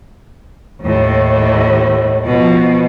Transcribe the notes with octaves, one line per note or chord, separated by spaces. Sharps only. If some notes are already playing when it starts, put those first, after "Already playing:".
D#2 A2
B2 F3